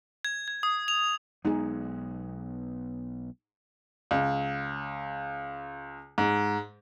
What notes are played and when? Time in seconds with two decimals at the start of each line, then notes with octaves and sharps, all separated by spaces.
0.25 G#6
0.48 G#6
0.63 D#6
0.88 F7
1.45 B1 G#3 B3 D#4 G#4
4.11 C#2
6.18 G#2